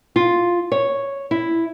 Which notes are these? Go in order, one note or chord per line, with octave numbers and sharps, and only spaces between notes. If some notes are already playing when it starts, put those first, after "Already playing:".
F4
C#5
E4